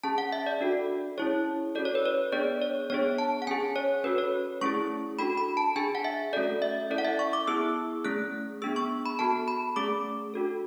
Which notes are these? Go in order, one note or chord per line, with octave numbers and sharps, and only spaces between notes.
C#4 G#4 A5
F#5
E5
D5
D4 F#4 A4
C#4 E4 G#4 C#5
C#4 F#4 A4 D5
C#5
B4
C#5
B3 D4 G#4 D5
C#5
B3 D4 G#4 C#5
A5
F#5
C#4 G#4 G#5
C#5
C#4 F#4 A4 B4
C#5
A3 C#4 E4 G#4 C#6
D4 F#4 A4 B5
B5
A5
D4 G#4 G#5
F#5
E5
A3 C#4 F#4 A4 D5
E5
C#4 E4 A4 D5
F#5
E5
C#6
D6
B3 E4 G#4 E6
A3 C#4 G#4 F#6
B3 D4 G#4 E6
C#6
B5
B3 F#4 A4 A5
B5
A3 C#4 G#4 D6
D4 F#4 A4